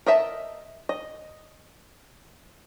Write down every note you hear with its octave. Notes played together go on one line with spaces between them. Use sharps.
A#4 D#5 E5 A5
D#5